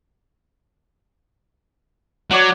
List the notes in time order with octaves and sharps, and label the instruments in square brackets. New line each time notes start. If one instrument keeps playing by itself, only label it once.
[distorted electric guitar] F#3 [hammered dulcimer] C#5 D5 F#5